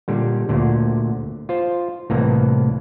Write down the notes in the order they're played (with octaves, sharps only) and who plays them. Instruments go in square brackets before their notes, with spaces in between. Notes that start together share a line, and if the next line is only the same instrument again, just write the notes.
[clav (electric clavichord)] A#2 D3 G3
D2 A#2 D3
F4 C5
C2 A2 E3 A#3 A#5